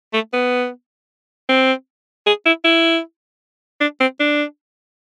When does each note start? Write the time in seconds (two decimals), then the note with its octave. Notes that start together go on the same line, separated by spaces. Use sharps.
0.14 A3
0.33 B3
1.49 C4
2.27 G#4
2.46 E4
2.65 E4
3.81 D4
4.00 C4
4.20 D4